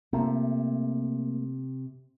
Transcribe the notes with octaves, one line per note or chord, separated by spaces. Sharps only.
C3 A3 A#3 F4